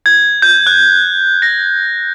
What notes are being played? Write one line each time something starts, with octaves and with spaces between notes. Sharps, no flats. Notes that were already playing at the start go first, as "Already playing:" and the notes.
G#6
G6
F#6
A#6